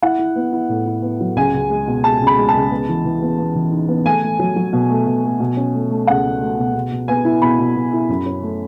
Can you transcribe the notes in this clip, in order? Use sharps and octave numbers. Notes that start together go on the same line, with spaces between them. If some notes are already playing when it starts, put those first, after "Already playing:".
E4 F#5
E4
B3
E4
A2
E4
B3
F#3
C#2 G#5
C#2
G#3
B2
G#3 A5
C#2
B5
G#3
A5
C#2
B3
E3
E3
B3
B3
E3
D#4
B3
A3 G#5
A3
F#3
F#3
B2
A3
B2
A3
B2
C#4
A3
A3
C#2 F#5
A3
A3
B2
B2
B2
B3 G#5
E4
B2 B5
B2
B2
E4
F#2
C#4
A3